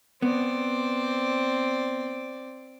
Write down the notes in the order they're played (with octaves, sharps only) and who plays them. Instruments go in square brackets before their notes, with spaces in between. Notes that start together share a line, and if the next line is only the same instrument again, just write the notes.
[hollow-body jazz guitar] B3 [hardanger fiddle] C4 D5